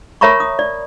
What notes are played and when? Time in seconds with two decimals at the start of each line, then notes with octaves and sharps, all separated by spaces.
0.21 A#4 C#5 E5 A#5 B5 C#6
0.40 D#6
0.59 D5